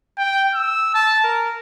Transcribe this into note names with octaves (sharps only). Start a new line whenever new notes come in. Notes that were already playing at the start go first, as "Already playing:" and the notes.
G5
E6
A5
A#4